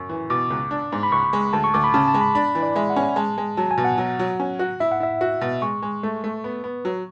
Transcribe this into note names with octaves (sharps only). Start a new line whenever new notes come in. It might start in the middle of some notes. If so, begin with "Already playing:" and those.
Already playing: F#2 C#6
E3
B2 D6
C#2
D4
G#2
B5
C#2 C#6
G#3
D2 A5
C#6
D2 D6
B5
C#3 A5
A5
G#3
B5
D4 B5
E3
D5
G#3 E5
F#5
C#4
G#5
G#3 A5
G#3
F#3 A5
G#5
B2
F#5
F#3
F#3
C#4
F#4
E4 E5
F#5
E4 E5
F#4
B2
G#3 C#6
G#3
A3
A3
B3
B3
F#3